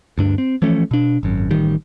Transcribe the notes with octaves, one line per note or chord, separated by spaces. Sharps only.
D2 G2 D4
C4
E3 F3 A3 C#4
B2 D4
G#1 F#2
A1 D#3 G3